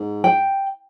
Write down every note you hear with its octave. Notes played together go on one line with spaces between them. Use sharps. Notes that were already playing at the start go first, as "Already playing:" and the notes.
Already playing: G#2
G5